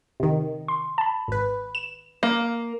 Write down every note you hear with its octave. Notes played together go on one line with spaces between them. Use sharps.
C3 D#3
C6
A5 B5
G#1 B4
E7
A#3